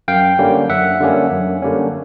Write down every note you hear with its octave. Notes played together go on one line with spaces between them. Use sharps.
F#2 F5 G5
D3 G3 A#3 C#4
F#2 E5 F#5
D3 G3 A#3 C#4
F#2
D3 G3 A#3 C#4